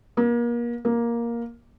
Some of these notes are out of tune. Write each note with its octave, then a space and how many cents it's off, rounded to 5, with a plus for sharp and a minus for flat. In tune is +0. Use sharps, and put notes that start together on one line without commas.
A#3 +35
A#3 +10